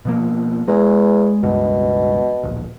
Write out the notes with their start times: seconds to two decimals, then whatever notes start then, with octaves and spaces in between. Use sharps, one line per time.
0.05 B2 F3 A#3
0.68 E2 G#3
1.43 E1 C#2 G2 B2
2.44 D1 A#1